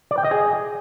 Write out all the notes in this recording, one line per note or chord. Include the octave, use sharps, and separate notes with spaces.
D5
G5
D#5
G#4